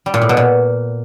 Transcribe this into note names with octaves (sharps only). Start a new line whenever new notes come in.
G3
A#2
A2
B2
A#2